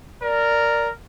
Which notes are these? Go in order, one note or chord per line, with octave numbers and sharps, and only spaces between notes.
A#4 D5